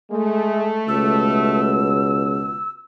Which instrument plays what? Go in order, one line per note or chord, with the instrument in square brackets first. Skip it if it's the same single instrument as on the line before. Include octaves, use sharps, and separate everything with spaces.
[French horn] G#3 [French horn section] A3
[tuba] C#2 [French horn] B2 [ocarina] E6